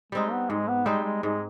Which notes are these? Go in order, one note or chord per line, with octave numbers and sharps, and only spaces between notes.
G3 G#3 C4 D#4
B3
G#2 G#3
B3
G3 G#3 C4 D#4
G#3
G#2 G#3